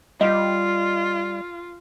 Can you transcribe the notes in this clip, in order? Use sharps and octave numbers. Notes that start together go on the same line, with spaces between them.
G3 F4 D#5